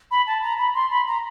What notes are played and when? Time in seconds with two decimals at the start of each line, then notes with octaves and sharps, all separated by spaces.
0.11 B5
0.27 A5
0.42 A#5
0.58 B5
0.75 C6
0.90 B5
1.07 A#5